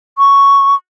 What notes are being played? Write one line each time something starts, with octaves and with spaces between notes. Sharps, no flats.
C#6